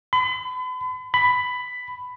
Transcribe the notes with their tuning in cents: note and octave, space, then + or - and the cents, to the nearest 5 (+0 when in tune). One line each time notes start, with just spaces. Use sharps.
B5 +40
B5 +10